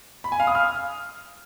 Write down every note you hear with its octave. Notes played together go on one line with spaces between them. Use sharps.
B5
G#5
F5
D#6
F6